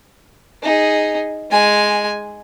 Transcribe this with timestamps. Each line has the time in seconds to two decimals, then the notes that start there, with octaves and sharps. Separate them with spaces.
0.63 D#4 G#4
1.51 G#3 G#5